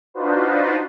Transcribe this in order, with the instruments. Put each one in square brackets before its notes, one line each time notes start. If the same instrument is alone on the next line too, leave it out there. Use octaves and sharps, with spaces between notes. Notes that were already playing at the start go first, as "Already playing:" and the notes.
[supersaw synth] D4 D#4 F4 F#4 B4 C5